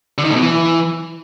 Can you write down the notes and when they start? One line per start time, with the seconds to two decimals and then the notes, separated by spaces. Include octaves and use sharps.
0.18 D3
0.24 D#3
0.30 A2
0.36 B2
0.42 E3